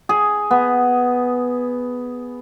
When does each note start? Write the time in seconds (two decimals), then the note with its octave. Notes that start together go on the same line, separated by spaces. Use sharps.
0.09 G#4
0.51 B3